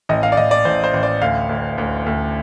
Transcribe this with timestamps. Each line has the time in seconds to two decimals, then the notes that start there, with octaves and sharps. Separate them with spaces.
0.09 A1 D#5
0.23 F5
0.32 D5
0.37 A1 D#5
0.51 D5
0.65 A1 C5
0.84 C5
0.94 A1
1.03 D5
1.21 D2 F5
1.49 D2
1.78 D2
2.06 D2